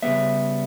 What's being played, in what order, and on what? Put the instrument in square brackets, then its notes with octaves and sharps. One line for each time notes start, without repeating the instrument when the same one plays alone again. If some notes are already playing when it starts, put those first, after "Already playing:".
[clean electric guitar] C#3 G3 B3 E5